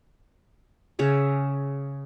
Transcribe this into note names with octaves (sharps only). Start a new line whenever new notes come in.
C#3 G#4 C#5 E5